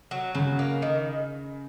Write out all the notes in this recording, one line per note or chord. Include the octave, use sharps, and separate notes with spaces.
F#3
C#3 F#3
A#3
D#3